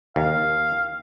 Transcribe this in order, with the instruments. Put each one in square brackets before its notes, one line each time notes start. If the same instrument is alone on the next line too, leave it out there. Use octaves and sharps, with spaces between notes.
[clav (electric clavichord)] D#2 [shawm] F5